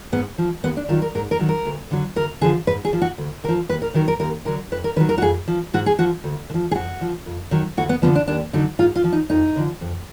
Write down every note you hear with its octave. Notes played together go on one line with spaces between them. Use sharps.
G#2 B3
F3
D#2 B3
D4
D#3 F#3 F4
A#4
G#2 A#4
A#4
D#3 F#3
A#4
D2
D3 F#3
D2 A#4
D3 F3 G#4
G#2 B4
G#4
F3
F#4
D2
D3 A#4
F3
D#2 B4
A#4
D#3 F#3 A#4
A#4
D#2 A#4
D3 F#3 A#4
F2 B4
A#4
D#3 F#3 B4
A#4
F#4
F2 G#4
F3
G#2 F#4
G#4
F3 F#4
D2
D3
F3
G#4
F2 F#4
F3
F2
D#3 F#3
D2 F#4
B3
D3 F3 B3
D4
D#2 D4
D3 F#3 D#4
G#2 F4
F4
F3
D#4
F2 D#4
D3 F3
F2